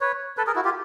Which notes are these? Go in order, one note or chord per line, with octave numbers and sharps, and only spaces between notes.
B4 C#5
A4 B4
G#4 A#4
E4 F#4
F4 G4